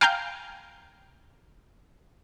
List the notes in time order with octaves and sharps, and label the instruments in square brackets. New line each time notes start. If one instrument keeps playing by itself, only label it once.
[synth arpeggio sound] F5 G5 G#5 A#5 F6 G6